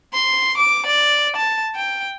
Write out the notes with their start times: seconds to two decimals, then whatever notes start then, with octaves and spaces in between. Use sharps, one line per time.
0.14 C6
0.58 D6
0.86 D5
1.36 A5
1.76 G5